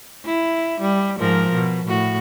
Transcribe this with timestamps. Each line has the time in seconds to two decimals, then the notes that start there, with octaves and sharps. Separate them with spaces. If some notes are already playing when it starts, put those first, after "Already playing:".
0.25 E4
0.81 G3
1.19 G#2 F3 A#4
1.53 B2
1.87 A2 F#4